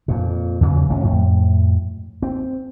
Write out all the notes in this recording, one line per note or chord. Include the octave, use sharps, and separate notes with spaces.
F2 A#2
E2 C#3 E3 F#3
G#1 C#2 C#4
F2 A2
C4